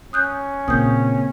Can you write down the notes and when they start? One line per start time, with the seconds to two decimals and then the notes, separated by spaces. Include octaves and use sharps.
0.13 C#4 D#6 F#6 G6
0.68 A#2 C#3 A#3 C4 D#6 G6